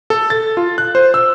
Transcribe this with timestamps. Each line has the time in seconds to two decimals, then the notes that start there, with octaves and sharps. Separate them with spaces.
0.10 A4
0.30 A6
0.57 F4
0.78 F#6
0.95 C5
1.14 E6